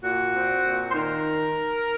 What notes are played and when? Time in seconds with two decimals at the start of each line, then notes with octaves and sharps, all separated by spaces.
0.02 A#2 F#4
0.33 C4
0.64 A#2
0.90 C5
0.94 D#3 A#4